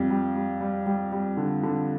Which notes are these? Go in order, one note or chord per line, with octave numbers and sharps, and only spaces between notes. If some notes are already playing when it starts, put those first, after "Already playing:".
Already playing: F2 G3
G3
G3
G3
G3
G3
D3
D3